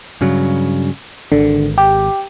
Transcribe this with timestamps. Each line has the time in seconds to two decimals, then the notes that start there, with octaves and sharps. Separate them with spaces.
0.21 G2 C#3 F#3
1.32 G#1 D3
1.78 G4